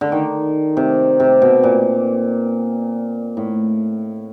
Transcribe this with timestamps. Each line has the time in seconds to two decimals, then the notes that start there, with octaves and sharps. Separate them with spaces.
0.01 D3
0.12 D#3
0.77 C3
1.20 C3
1.42 B2
1.63 A#2
3.37 A2